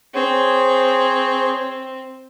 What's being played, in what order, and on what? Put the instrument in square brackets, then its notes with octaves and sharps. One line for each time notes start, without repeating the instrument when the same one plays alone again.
[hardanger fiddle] C4 [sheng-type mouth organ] G#4 C5 C#5